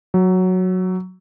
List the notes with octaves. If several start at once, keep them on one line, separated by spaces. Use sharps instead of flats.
F#3